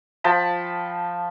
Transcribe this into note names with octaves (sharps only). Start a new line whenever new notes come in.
F3 G5 A5 B5